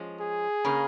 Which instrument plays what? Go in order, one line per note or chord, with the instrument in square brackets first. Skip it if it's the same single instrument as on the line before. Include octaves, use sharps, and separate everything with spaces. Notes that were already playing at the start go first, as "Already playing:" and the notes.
Already playing: [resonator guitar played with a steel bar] F3 G#3 C#4
[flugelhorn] G#4
[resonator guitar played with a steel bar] C#3 A#3 C#4 A#4